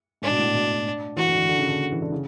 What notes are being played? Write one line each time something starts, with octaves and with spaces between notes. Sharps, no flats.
G#2 D4
B2
A2
B2
E3 F#4
D3
E3
D3
C#3
D3
E3
D3
C#3